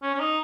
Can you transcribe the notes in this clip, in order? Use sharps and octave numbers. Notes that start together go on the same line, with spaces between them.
C#4
C#4
D#4